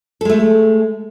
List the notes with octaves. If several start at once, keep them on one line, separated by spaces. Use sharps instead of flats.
G#3 A3 A4